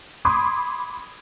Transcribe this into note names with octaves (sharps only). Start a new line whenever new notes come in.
B5 C6 D6 D#6 G#6